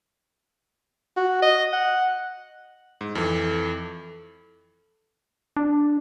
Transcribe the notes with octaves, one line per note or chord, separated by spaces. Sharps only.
F#4
D#5
F#5
G#2
F2 E3 A4
D4